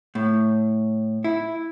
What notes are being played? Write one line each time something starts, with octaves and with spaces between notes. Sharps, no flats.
A2
E4